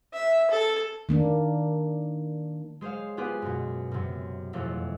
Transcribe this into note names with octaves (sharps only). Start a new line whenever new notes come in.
E5
A4
D#3 A#3 D4
G#3 G#4 C5 C#5 F5
B3 F4 G4 G#4 B4
F#2 B2
F#2 C3
E1 F2 A3 C#5